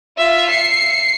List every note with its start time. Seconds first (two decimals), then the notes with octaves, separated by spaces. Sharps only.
0.18 F4 E5
0.50 C7 C#7